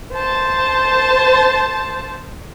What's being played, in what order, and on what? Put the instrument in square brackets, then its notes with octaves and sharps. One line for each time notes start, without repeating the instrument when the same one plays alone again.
[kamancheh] C5 A5